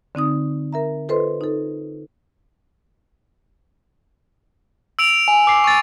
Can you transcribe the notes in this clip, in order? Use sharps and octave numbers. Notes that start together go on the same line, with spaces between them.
D3 C4 D#4 D#6
A#4 E5 A#5
F4 A4 B4 C5 D#5 C6
D#4 A4
E6 D7 F7
G#5
D6 C7
C#6 A6